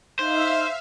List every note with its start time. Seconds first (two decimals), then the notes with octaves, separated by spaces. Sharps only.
0.19 D#4 C5 E5 F5